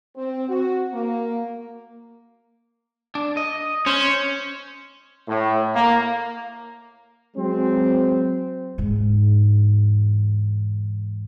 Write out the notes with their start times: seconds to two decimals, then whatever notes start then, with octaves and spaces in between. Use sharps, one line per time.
0.16 C4
0.48 F#4
0.93 A#3
3.15 D4
3.37 D#5
3.87 C#4 C5
5.29 A2
5.75 A#3
7.37 F#3 G#3 C4
8.78 E2 G#2